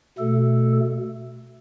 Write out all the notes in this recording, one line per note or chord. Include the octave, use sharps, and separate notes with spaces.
B2 A3 A4